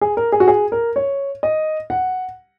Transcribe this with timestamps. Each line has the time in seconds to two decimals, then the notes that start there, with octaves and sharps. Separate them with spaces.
0.01 G#4
0.17 A#4
0.32 G#4
0.40 F#4
0.48 G#4
0.72 A#4
0.96 C#5
1.43 D#5
1.90 F#5